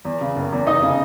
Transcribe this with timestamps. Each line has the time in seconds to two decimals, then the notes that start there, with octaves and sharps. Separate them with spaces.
0.05 E2
0.21 C#3
0.36 F#1
0.52 E2
0.67 F1 D#4 D#5
0.82 C#3